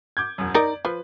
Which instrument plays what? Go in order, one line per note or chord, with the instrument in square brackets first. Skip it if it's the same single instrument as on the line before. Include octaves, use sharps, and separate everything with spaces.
[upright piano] D6 G6 G#6
E1 F#2
[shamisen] D#4 A#4 [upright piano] D5
[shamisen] F3 [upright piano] B4